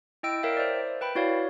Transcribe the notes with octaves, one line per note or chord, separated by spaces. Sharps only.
E4 D#5 G5 E6 D7
A#4 C#5 E5 F5 G5
C5 D5
B4 G5 B5
E4 F#4 C#5 D5 F5